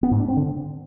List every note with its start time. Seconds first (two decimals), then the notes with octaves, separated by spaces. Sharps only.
0.03 B3
0.11 G#2
0.20 D4
0.28 C4
0.37 D3